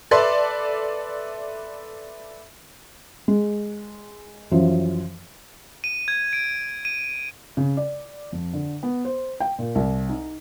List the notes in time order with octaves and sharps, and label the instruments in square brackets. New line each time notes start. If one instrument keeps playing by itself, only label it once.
[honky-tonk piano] A4 B4 D5 E5 C6
[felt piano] G#3
F#2 E3 F3
[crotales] D#7
G#6
D7
D#7
[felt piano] C#3
D5
F2
D3
B3
C5
G5
A#2
C2
D#4